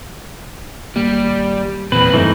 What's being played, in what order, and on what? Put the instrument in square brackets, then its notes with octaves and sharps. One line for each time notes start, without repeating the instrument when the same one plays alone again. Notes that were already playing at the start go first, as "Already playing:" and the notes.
[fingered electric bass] G#1 A#3 [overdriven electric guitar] G3
[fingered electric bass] D#1 E2 A#2 [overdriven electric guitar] B1 C4 [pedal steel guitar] B4
[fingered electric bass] F1 G2 [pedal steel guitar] E3 A3 D#4